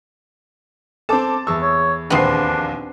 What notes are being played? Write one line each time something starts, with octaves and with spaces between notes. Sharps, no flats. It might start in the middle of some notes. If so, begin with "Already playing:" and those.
C4 A4 A5 D6
E2 C#6 E6
C#5
A#1 D#2 B3 C4 D4 C7